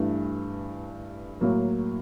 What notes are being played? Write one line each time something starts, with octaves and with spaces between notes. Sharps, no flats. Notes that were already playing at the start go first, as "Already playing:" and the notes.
Already playing: G2 E3 A3
A2 F#3 A#3